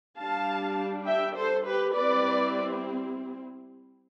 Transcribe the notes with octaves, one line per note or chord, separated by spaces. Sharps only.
G3 D4 F5 A5
E5 G5
A4 C5
G4 B4
G3 C4 E4 B4 D5